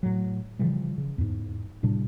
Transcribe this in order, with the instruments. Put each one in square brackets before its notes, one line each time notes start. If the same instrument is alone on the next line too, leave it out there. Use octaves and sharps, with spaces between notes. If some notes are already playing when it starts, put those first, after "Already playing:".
[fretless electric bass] A2 F#3
C#3 E3 F3 G3
C#3
E2 G#2
A2 C3 G3 D4